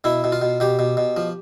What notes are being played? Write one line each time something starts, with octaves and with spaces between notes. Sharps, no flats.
B2 E4
B2
F4
B2
B2 G4
B2
B2
F3